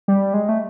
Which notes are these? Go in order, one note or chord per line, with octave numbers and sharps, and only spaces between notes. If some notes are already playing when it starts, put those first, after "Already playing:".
G3
G#3
A3